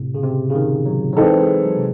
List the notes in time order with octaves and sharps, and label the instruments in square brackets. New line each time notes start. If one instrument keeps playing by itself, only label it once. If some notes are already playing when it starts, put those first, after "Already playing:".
Already playing: [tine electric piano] A2 C3
C#3
C3
C#3
D#3
F#3
F#3
[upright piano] E3 C4 D#4 A4 [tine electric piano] G#3
[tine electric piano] G#3
F#3
C3